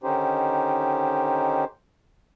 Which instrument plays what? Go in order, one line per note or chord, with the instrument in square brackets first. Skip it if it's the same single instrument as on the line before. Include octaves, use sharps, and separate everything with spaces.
[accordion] D3 D#3 C#4 D#4 G4 C5